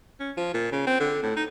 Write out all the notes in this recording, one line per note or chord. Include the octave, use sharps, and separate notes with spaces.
C#4
F3
A#2
C#3
C4
D3
A2
D#4